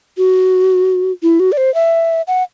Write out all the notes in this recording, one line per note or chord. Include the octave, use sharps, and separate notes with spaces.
F#4
E4
F#4
D5
C5
E5
F#5